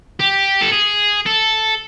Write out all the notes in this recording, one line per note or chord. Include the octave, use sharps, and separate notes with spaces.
G4
A4
G#4
A4